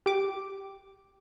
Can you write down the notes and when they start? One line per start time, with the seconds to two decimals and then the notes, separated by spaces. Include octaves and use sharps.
0.06 G4 D6